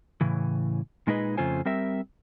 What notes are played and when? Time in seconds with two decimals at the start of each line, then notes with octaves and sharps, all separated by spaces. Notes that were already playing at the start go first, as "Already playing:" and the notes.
0.21 A2 C#3 E3
1.07 A#2 G#3 D#4 G#4 B4 D#5
1.38 F2 C#3 A3 F4 C5 G#5
1.65 G3 C4 A#4 E5